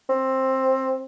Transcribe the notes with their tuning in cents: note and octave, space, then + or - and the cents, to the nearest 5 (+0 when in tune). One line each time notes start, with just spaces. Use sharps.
C4 +15